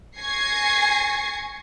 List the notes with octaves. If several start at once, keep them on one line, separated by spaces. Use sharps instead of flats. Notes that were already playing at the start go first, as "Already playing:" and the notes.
G#5 C#6 G#6 A#6 C7